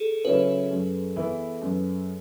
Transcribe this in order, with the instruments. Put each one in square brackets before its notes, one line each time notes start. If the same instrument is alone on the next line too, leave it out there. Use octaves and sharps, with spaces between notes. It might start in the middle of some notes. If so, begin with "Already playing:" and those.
Already playing: [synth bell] G#4 A4
[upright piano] C#3 F#3 C#4 E4 [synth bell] B4
[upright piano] F#2
E3 B3 E4
F#2